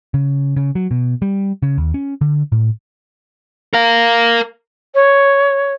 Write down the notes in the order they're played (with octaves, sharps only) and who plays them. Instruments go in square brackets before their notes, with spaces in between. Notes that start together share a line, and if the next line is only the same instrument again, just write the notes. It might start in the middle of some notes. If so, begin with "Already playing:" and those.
[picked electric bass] C#3
C#3
F#3
B2
G3
C#3
D#2
C#4
D3
A2
[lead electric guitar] A#4 F5
[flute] C#5